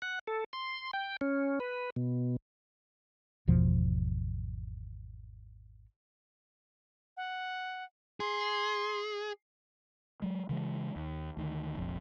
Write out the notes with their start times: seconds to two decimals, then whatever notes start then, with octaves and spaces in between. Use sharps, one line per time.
0.02 F#5
0.27 A4
0.53 C6
0.93 G5
1.21 C#4
1.60 B4
1.96 B2
3.47 G#1 E2 B2 F3
7.17 F#5
8.20 G#4 C6
10.22 F#3 G#3
10.49 C#3 E3 G#3
10.96 D#2
11.37 D2 D#3
11.76 F1 A#1 F2